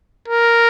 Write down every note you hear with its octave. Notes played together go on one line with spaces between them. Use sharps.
A#4